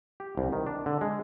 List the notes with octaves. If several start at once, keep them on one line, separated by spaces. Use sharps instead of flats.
G4
C2
D#3
D4
D3
G#3